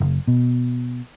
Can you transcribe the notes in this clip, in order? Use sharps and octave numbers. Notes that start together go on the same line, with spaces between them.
F#1
B2